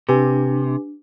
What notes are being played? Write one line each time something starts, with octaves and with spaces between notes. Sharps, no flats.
C3 D4 G4 B4 G#5